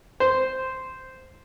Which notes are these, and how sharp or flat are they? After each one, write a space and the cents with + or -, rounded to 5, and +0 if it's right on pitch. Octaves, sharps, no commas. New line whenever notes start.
C5 -5